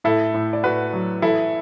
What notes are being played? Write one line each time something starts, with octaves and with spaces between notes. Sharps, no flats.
A2 E4 A4
A2
D5
A2 F#4 B4
F#3
E3 E4 A4